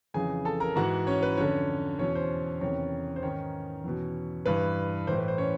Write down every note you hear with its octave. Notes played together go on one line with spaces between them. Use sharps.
F2 C#3 E3 G#4 G#5
A4 A5
A#4 A#5
G#2 E3 F#4 F#5
C#4 C#5
B4
F2 D3 C#4 C#5
E2 B2 C#4 C#5
C5
E2 C3 D#3 C#4 C#5
C5
G#2 D#3 C#4 C#5
E2 B2
G2 E3 B4
A2 E3 C5
B4
C5
C#4 C#5